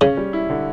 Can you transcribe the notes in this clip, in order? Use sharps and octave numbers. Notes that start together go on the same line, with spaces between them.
C#3 C#4
G3
E4
D3